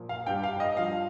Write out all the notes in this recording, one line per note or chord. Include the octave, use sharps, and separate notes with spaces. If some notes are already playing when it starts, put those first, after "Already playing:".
Already playing: A#2 F3
F5
G2 G3 G5
F5
D#5
G2 F3 F5